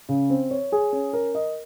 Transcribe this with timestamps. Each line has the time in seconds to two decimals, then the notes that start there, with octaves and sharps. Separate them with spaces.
0.09 C#3
0.30 C4
0.51 C#5
0.72 G#4
0.93 C#4
1.13 A#4
1.35 D#5